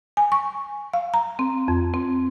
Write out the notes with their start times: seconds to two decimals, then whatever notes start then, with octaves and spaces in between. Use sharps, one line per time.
0.17 G#5
0.32 C#6
0.94 F5
1.14 A#5
1.39 C4
1.68 F2
1.94 C4